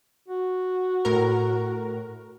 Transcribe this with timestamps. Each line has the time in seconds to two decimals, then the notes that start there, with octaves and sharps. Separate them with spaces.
0.28 F#4
1.05 A2 A#4